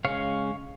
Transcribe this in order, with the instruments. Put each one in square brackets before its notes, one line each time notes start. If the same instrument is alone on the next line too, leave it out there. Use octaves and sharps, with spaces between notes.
[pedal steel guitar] C#3 G#3 C#4 C#5 F5